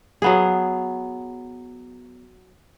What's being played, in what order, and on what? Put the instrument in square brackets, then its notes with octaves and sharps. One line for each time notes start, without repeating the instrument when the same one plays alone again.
[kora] F#3 B3 G#4